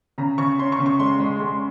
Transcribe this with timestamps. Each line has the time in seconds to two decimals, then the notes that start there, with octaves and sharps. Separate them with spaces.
0.18 C#3 A#5
0.38 C#3 C#6
0.59 C#4 C6
0.72 C#6
0.79 C#3
0.86 C#6
0.99 G#3 C6
1.20 G#3
1.40 G#3